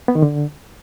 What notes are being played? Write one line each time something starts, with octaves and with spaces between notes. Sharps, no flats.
B3
D#3
D3